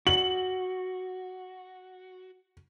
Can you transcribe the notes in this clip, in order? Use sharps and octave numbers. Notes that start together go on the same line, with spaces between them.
F#4 F#7